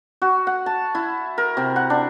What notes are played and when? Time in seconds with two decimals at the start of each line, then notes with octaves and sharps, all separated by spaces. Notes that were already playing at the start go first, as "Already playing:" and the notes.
0.22 F#4
0.47 F#5
0.66 A5
0.95 E4
1.38 A#4
1.57 C3
1.76 F#5
1.90 D4